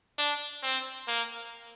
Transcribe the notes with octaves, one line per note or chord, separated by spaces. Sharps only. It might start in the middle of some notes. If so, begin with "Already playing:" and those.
D4
C4
A#3